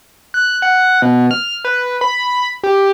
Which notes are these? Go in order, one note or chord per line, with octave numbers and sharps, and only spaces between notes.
F#6
F#5
B2
F6
B4
B5
G4